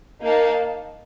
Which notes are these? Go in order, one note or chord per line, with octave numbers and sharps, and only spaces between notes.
A#3 D#4 A#4 F5 A5